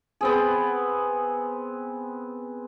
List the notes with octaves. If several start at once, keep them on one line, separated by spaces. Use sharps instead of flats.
B3 C4 G#4